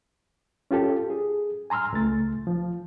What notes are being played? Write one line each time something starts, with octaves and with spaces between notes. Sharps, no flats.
C#4 F4 G4 A4
G#4
G#5 A#5 C6 E6 F6
C#2 A3 A6
F3